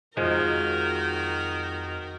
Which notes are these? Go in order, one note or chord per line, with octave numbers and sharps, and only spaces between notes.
F2 D#3 F3 G#3 F#4 A#4